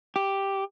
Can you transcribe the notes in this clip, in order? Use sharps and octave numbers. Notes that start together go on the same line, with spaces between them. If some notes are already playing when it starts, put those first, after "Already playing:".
G4